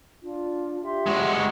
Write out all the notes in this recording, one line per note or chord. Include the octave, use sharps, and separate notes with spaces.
D4 F4
G4 E5 C6
G#3 F#4